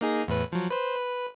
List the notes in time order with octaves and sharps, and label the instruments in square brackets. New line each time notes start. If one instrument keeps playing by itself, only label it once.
[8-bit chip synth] A#3 D#4 G#4
E2 A2 B4
F3 F#3
B4 C5
B4